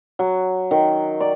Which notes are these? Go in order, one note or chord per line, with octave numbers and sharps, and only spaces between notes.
F#3
D#3
D5